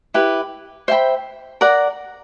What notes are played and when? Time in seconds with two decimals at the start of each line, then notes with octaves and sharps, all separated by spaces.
0.14 E4 G4 B4
0.88 C5 E5 G5 B5
1.61 A#4 D5 F#5 A#5